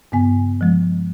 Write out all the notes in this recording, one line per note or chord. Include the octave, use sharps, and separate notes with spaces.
G2 C#3 B3 G#5
F3 G#3